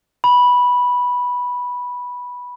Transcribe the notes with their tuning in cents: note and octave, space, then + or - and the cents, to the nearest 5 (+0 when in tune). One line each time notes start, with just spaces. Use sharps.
B5 -10